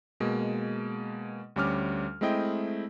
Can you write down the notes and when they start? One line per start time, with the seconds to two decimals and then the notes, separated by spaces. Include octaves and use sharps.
0.20 B2 G#3 A#3
1.56 D2 G3 C#4 D6 F6
2.21 G#3 A3 C4 E4 D#5 G5